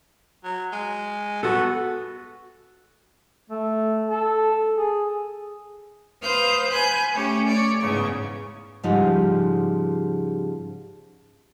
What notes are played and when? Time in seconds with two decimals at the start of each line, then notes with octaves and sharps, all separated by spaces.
0.44 F#3
0.72 G#3
1.43 B3 F#4 A4
3.50 A3
4.09 A4
4.77 G#4
6.22 B4 C5 F5 D#6 F6 G6
6.69 G#5 B5 F#6 G6
7.12 A3 C#4 G4
7.46 C#5 D5
7.79 E2 G#2 C#3 C#6
8.83 G#2 C#3 F3 G3 D#4 G4